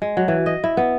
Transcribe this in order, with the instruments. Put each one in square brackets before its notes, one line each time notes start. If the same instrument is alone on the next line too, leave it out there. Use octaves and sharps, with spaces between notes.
[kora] G#3
F#3
E3
D#5
E4
B3